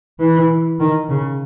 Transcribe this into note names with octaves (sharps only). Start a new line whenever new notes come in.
E3
D#3
C#3